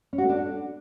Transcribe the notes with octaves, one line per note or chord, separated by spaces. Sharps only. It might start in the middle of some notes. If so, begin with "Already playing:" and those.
C#4
F#4
A3
D4